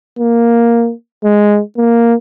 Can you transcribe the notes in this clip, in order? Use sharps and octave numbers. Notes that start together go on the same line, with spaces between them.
A#3
G#3
A#3